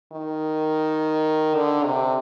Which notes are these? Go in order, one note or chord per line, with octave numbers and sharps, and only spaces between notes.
D#3
D3
C3